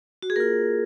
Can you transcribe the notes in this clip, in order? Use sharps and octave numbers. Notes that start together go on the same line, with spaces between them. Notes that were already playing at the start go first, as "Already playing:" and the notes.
F#4
G#4
A#3 F4 A#4